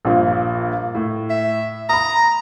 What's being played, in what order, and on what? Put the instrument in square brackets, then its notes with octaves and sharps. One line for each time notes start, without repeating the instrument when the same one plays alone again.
[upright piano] A#1 G2 A#2
A2
[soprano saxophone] E5
[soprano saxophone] A#5 [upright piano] B5 D#6